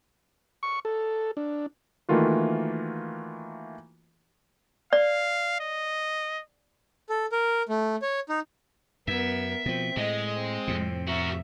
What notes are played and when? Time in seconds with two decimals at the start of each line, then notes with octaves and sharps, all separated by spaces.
0.63 C#6
0.85 A4
1.37 D4
2.09 D#3 E3 A3 A#3 F4 F#4
4.93 D5 F5
5.60 D#5
7.10 A4
7.32 A#4
7.69 A3
8.02 C#5
8.29 D#4
9.08 F#2 B3 A#4 E5
9.66 B2 F3 C4
9.97 A2 G#3 D#5
10.33 C4
10.68 F2 A2 C3
11.08 F#4 A#4 E5